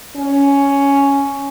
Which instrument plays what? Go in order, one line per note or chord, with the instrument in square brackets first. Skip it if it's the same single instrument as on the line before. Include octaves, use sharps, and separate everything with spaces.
[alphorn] C#4